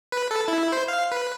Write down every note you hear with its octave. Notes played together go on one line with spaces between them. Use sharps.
B4
A4
E4
C5
F5
B4